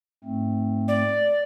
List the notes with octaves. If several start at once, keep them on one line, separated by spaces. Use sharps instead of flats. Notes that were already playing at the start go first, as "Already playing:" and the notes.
G#2 A3 C4
D5